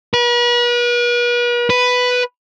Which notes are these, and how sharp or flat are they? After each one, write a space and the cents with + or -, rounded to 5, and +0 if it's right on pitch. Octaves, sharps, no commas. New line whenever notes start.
B4 -40
B4 +5